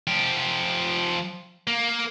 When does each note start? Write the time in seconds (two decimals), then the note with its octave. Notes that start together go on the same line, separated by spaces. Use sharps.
0.07 F3 G4
1.67 A#3